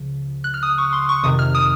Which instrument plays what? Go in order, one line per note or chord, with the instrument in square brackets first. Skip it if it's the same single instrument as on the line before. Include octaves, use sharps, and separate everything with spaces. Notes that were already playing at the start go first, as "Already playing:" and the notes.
Already playing: [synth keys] C#2 C#3 F3
F#6
F6
D#6
C#6
C6
C#6
F2 C3 D#3 D#6
F6
D#6